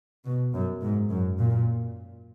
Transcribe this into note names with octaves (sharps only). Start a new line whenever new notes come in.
B2
F#2
G#2
F#2
A#2